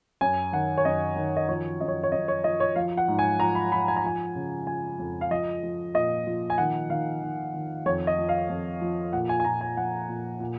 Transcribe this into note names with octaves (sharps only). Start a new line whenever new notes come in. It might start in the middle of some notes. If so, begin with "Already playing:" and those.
F#2 G#5
D#3 F#5
C#5
F#2 D#5
D#3
D#5
F3 C#5
F#2 D#5
C#5
C#5
F#2 D#5
C#5
F3 D#5
C#5
F3 F5
F#5
G#2
G#5
F3 A#5
B5
F3 B5
G#5
A#5
F3 G#5
C#3
F3 G#5
F2
F5
F3 D#5
F3
A#2 D#5
F3
G#5
D#3 F#5
D#3 F5
D#3
D#3
F2 C#5
D#5
F3
F5
F2
F3
A#2 F#5
G#5
G#5
A#2 A#5
G#5
F3 F#5
A#2
A#2